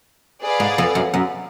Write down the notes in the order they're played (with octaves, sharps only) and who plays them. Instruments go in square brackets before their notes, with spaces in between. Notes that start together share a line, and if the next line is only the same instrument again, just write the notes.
[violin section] G#4 B4 D5 F5
[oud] G#2
F2
F#2
F#2